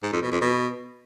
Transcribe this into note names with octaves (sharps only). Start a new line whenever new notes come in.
G#2
F2
B2
F2
B2